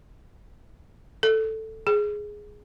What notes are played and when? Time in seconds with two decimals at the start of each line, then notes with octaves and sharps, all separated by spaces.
1.23 A4
1.87 G#4